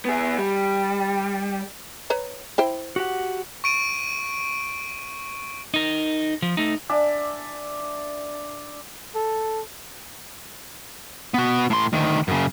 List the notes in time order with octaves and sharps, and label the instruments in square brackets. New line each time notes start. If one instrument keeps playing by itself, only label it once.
[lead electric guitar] B3 G#4
G3
[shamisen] B4 C#5 A#5
E4 C5 G5
[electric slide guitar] F#4 G4 F#5
[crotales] C#6 D7 D#7
[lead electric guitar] D#4 A#4
F3
A3 D#4
[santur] D4 D5 E5 G#5
[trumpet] A4
[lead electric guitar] B3 F#4
A2 C6
D2 D#3
F#2 C#3